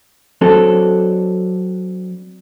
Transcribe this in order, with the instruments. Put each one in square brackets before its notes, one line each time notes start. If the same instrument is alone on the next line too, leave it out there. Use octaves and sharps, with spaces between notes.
[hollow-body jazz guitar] F#3 C4 D4 A4